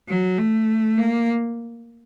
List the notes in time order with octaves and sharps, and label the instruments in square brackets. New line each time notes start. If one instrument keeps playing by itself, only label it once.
[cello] F#3
A3
A#3